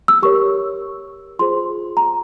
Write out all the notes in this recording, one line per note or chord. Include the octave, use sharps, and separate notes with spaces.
E6
G4 A#4 C#5 C#6
F4 G#4 C5 C6
A#5